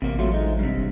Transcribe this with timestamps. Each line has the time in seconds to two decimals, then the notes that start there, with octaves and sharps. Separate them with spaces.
0.02 A1 C3 A#3
0.19 F#3 A3 F4
0.32 G#3 D#4
0.59 G2 C3
0.75 E1